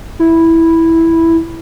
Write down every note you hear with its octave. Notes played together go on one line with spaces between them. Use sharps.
E4